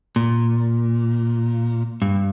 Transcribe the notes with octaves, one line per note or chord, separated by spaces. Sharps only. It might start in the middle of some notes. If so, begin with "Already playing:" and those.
A#2
G2